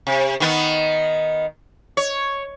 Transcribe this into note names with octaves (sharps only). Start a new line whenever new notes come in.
C3
D#3 B3
C#5